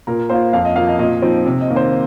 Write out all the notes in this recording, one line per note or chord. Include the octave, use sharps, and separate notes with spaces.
A#2 A#4
A#3 F4 C5
F2 F5
D#5
F3 A#3 F5
D#5
A#2 D#5
F3 C4 D#4
C3
D#5
D#3 A#3
C5